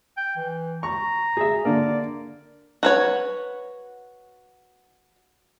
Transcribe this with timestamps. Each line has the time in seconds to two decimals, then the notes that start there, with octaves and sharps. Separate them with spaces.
0.17 G5
0.37 E3
0.83 A#5 C#6
1.37 G#4 E5
1.65 D3 A#3 D5
2.83 F#4 B4 C#5